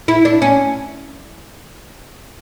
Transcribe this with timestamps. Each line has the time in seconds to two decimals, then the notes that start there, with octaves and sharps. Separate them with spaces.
0.08 E4
0.25 D4
0.42 C#4